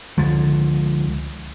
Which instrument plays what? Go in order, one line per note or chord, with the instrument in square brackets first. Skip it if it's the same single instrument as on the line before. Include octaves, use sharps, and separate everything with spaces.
[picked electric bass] C#2 D3 F3 G#3